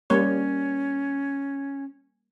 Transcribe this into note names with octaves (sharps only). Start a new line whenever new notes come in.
G3 A#3 C#4 C#5